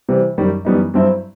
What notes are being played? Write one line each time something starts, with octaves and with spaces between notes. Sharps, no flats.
C3 E3 G3
F#2 D#3 G3
F#2 E3 G3 B3 D#4
G2 F#3 C4 E4